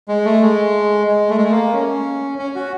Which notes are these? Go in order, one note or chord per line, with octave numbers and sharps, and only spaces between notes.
G#3
A3
G#3
G#3
A3
G#3
A3
A#3
C#4
C#4
F#4